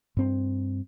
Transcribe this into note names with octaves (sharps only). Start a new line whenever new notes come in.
G2 C4